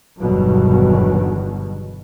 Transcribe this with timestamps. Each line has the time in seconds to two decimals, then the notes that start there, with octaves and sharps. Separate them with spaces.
0.20 G1 E2 G2 B2 D#3 F#3